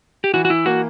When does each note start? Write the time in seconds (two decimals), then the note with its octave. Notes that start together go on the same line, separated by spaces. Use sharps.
0.24 G4
0.33 E3 F#4
0.45 F#4
0.50 E4
0.66 A#3 F#4